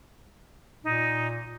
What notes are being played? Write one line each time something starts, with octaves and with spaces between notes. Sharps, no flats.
A#2 D#4